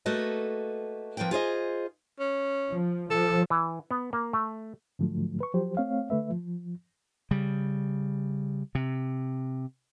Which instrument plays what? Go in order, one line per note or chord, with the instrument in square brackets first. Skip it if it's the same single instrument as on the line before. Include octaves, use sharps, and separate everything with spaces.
[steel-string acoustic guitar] A3 A#3 F#4 A4 B4 D#5
F3 A#3 C4 B4 G5
F4 G#4 C5 D#5
[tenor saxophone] C#4
[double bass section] F3
[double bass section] F3 [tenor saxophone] A4
[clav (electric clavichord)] E3
B3
A#3
A3
[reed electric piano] G#2 D3 F3 F#3 A3
B4 C#6
F3 F#3 G4 C5
A3 C4 C#5 F5
D3 A3 B4 E5
F3
[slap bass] C#3 G3
C3